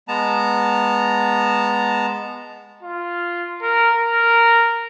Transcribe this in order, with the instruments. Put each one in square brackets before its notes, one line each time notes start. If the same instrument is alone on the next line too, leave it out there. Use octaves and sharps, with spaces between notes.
[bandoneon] G#3 B3 A5 A#5
[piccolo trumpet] F4
A#4
A#4